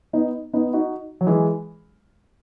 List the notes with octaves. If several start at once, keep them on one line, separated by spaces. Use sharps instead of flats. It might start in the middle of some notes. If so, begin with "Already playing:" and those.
B3 D#4
B3 D#4
D#4 F#4
F#3
E3 G#3